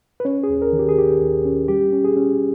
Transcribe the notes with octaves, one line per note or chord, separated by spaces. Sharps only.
B4
C#4 C#5
G#4
D#2
A#4
D#3
G4
G#4
D#3 G4
D#2
C#4
G3 G4
C#4
G#4
C#4